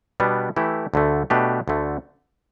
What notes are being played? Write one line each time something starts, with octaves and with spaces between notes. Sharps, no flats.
B2 G3 B3 D4
E3 A3 E4 G4
D2 D3 A3
B2 A3 D4 G4 B4
D2 D3 A3